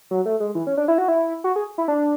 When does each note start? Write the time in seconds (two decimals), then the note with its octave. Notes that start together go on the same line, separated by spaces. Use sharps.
0.11 F#3
0.26 A3
0.40 G#3
0.55 E3
0.67 C#4
0.77 D4
0.88 E4
0.98 F#4
1.08 E4
1.44 F#4
1.56 G#4
1.78 E4
1.88 D4